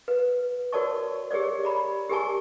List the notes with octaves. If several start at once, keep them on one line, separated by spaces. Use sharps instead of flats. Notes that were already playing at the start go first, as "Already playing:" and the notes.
B4
F#4 A#4 C#5 D5 A5 C#6
G4 G#4 A#4 C#5 D5
D5 A#5 B5
G4 G#4 A#4 G#5 A5 C#6